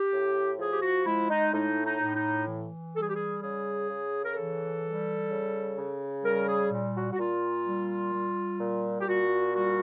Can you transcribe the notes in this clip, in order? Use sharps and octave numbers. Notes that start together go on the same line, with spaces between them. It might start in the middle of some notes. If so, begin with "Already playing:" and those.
Already playing: G4
A2
F3 G#4
G4
F#4
G#3 E4
D#4
A2 D#4
D#4
A2
D#4
E3
G3 A4
G#4
G4
G#4
C#3 G#4
C#3
A#4
E3 A4
G3
C#3
C#3
G3 A#4
G#4
A#2
F#4
F#4
A#2 F4
G3
G3
A#2
G4
A#2 F#4
G3 F#4